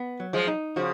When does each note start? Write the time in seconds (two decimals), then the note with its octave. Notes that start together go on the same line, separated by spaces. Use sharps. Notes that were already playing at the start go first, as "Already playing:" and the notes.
Already playing: B3
0.20 F#3
0.33 F3 G#3
0.47 D#4
0.76 C#3 F3 F#4